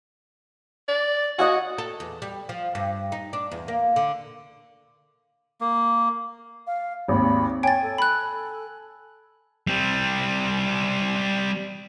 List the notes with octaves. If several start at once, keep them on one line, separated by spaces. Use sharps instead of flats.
D5
F#4 D#5 F#5 G#5
A4
E2
G3
F3
G2
D#4
D4
E2
A#3
D3
A#3
F5
G#1 D#2 B5
C#5 G5 G#5 A6
A4
B5 F#6
G3 C4